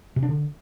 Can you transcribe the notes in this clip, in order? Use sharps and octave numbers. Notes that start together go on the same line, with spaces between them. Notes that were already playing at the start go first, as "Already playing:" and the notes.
C3
D4
D3